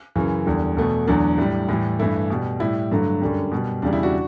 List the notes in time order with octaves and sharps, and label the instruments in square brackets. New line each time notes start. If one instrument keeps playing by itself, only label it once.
[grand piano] F#2 C#3 E3
E2 D3 G3
E2 B2 A3
E2 D3 F#3 A3 D4
A2 G3
A2 E3 G3
G2 E3 A3 E4
B2 G3
A2 G3 E4
G2 D3 F#3 A3
F#2 D3 G3
B2 G3
E2 C#3 G3 D4
E4
D4 F#4